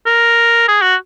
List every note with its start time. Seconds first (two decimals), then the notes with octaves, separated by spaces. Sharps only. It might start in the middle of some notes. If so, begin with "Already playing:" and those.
0.06 A#4
0.69 G#4
0.82 F#4